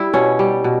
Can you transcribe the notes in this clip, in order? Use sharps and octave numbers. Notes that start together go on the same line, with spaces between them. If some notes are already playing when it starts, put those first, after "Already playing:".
Already playing: G3 E4
B2 C#4
G3
B2